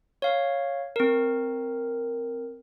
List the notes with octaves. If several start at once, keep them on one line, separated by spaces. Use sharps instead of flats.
C#5 F5
C4 A#4